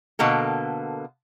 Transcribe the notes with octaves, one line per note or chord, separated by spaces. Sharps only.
B2 D3 A#3 A4